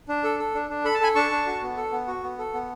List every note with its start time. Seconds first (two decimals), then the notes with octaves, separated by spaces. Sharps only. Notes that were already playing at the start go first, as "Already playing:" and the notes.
0.09 D4
0.24 A4
0.39 A4
0.54 D4
0.70 D4
0.85 A4 B5
0.94 A5
1.01 A4 G#5 B5
1.15 D4 A5 C#6
1.31 D4
1.46 F#4
1.62 B3
1.77 A4
1.92 B3
2.08 F#4
2.23 B3
2.38 A4
2.54 B3